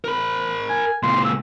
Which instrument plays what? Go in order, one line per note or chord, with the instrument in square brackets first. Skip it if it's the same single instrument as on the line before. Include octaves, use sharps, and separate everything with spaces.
[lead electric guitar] A#4 B5
[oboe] G#5
[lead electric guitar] C#2 A#2 [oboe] C6
[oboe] E6